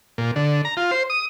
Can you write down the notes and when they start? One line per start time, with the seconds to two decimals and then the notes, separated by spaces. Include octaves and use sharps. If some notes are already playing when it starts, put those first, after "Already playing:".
0.18 A#2
0.36 D3
0.65 A#5
0.77 F4
0.91 C5
1.10 D#6